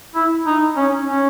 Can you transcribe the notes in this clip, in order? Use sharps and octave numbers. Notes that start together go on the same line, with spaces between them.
E4
D#4
C#4
C#4